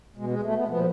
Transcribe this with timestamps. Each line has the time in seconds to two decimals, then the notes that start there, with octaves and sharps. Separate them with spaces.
0.17 B2 G#3
0.29 G#3
0.43 A3
0.55 B3
0.68 A#2 F3 B3